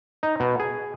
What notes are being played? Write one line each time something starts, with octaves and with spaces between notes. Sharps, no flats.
D#4
B2
G#4